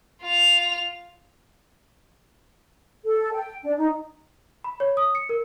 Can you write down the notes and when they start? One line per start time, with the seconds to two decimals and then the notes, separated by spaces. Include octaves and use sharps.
0.23 F4 F7
3.04 A4
3.33 G5
3.63 D4
3.77 D#4
4.64 B5
4.80 C#5
4.97 D#6
5.15 C#7
5.29 A#4